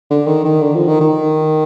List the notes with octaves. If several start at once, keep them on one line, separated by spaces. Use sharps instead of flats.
D3
D#3
D#3
D3
F3
D#3
D#3